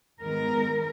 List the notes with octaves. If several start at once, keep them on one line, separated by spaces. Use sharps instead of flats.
G#2 D#3 G#3 B3 A#4